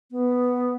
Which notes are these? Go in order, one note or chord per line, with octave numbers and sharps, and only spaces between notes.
B3